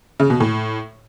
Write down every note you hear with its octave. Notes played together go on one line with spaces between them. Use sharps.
C#3
B2
A2